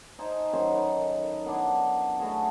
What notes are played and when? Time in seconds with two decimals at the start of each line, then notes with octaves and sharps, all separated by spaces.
0.19 D#4 C5 G#5 A5
0.53 F#2 D#3 C5 G#5
0.72 D#4 A4 B4
1.46 B3 D4 E4
2.20 A3 B3 F#4 G#4